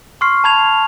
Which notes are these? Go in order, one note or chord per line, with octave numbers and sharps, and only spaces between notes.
C6 C#6 F6 C7
A5 B5 G#6 F7